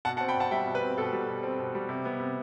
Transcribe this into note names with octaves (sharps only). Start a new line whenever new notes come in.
B2 F#5 A5
F#5 A5
C4
G5 B5
B2 F#5 A5
G3 E5 G5
B2
B4
C4
B2 A4
G3
B2
C4
B2
G3
C3
B3
C3